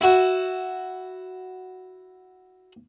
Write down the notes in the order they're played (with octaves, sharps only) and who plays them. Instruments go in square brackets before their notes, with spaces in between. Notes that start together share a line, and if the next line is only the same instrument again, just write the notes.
[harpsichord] E4 F#4